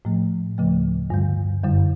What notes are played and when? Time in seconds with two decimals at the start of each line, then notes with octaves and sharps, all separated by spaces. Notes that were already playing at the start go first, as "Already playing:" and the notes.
0.05 A2 F3 A3
0.58 D2 C#3 F3 A3
1.10 G2 D3 G3
1.63 F#2 D3 G3